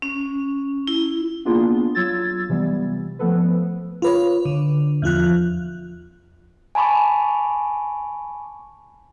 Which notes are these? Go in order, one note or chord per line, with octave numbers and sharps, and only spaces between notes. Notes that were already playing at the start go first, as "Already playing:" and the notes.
C#4
E4
A#3 B3 D4 E4 F4 G#4
F#3 F4 E6 G#6 A6
C3 E3 G3 B3
F3 A3 B3 A4 B4
F4 B4 C#5
D3
E2 F3 F4 F#6
G#5 A5 B5 C#6 D6